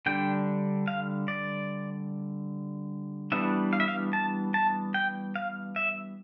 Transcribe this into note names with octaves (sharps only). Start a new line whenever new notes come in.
D3 G3 D4 G5
F5
D5
E3 G3 B3 D4 E5
F5
E5
F5
A5
A5
G5
F5
E5